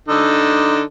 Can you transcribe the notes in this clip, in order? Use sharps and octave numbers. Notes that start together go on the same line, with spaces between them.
D3 D#4 A4